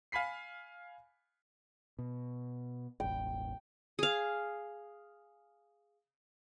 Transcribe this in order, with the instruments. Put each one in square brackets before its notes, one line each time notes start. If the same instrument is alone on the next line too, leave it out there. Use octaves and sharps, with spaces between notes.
[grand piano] F5 G#5 B5 B6 C7
[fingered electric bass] B2
[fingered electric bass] E1 A1 [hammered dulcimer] G5
[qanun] G#4 F5